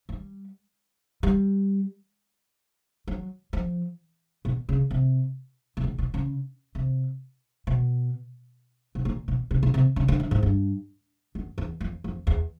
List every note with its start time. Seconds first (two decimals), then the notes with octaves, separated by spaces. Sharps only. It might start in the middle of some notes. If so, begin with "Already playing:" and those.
0.09 G3
1.23 G3
3.07 F#3
3.53 F3
4.45 B2
4.69 C#3
4.91 C3
5.77 B2
5.84 A#2
5.98 B2
6.14 C#3
6.75 C3
7.67 B2
8.95 B2
9.05 A#2
9.28 B2
9.51 C3
9.63 B2
9.74 C3
9.96 C#3
10.08 D3
10.20 D3
10.31 G#2
10.43 G2
11.35 F#2
11.58 E2
11.81 F2
12.04 F2
12.27 E2